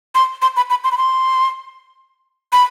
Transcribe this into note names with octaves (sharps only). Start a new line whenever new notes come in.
C6
C6
B5
B5
C6
B5
C6
B5